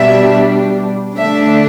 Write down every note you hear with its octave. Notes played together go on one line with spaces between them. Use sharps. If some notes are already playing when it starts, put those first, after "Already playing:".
Already playing: B2 G3 D4 E5
D3 A3 D4 E5